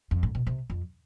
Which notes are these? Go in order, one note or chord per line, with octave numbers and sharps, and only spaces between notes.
F2
A2
B2
C3
F2